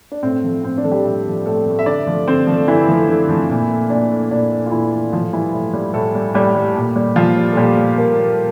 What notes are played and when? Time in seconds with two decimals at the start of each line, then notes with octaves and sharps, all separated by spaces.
0.12 D4
0.23 A2 C4
0.44 F3 A3
0.64 A2 C4
0.78 D4
0.84 F3 A3 A4
0.91 G3 G4
1.05 A2
1.26 F3 A3
1.46 A2 A3 A4
1.66 F3 A3
1.79 E5
1.86 D3 D4 D5
2.07 F3 A3
2.27 D3 C4 C5
2.47 F3 A3
2.68 D3 E3 E4
2.89 F3 A3
3.09 D3
3.29 F3 A3
3.49 A#2
3.70 A3
3.90 A#2 D4
4.10 A3
4.31 A#2 D4
4.51 A3
4.66 F4
4.71 A#2 E3 E4
4.92 A3
5.12 A2 F3 F4
5.33 E3 G3 E4
5.53 A2
5.74 G3
5.94 A2 A3 A4
6.15 G3
6.34 A2 G3 G4
6.55 G3
6.76 A#2
6.96 G3
7.16 A#2 F3 F4
7.37 G3
7.52 A4
7.57 A#2 G3 G4
7.77 G3
7.98 A#2 A#3 A#4
8.18 G3